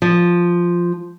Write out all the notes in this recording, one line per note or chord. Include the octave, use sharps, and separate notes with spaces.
F3